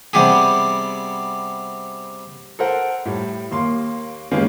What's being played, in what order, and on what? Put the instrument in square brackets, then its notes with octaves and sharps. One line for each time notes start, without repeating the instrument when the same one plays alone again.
[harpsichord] C3 G3 B3 G4 G#4
[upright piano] A4 A#4 C5 F#5
A2 G3
D#2 A#3 C6
D#3 G3 G#3 A#3 B3 C#4